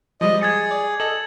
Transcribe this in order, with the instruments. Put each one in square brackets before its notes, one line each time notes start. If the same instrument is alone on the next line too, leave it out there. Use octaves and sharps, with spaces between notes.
[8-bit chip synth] F3 G3 G#3 [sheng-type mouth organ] D#5
[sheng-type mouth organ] G#4 [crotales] G#6 A6 C#7
[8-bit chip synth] D5
[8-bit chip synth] A4 D#5 [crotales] F#7